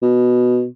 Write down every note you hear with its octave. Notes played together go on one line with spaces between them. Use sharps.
B2